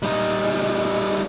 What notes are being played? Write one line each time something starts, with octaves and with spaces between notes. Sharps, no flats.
G3 D#4